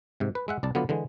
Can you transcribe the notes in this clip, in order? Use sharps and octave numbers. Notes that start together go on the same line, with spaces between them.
G#2 C3
B4
G#3 E5 F#5
C2 D5 A5
D3 F#3 B3 F4 D5
D3 E3 G#3